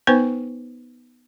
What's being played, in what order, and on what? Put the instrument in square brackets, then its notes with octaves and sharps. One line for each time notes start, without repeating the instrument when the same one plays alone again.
[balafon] B3 D#4 B4 C5 G#5 C#6